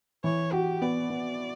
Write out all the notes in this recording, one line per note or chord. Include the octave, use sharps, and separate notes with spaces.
E3 C#5
F#4 G4
B3 D5
B3